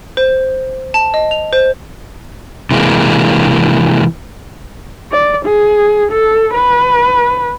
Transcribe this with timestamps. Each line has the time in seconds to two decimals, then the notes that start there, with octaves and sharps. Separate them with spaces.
0.17 C5
0.94 A5
1.14 D#5
1.31 F7
1.53 C5
2.71 C3 E3 G#3 A#3
5.11 D5
5.46 G#4
6.12 A4
6.54 B4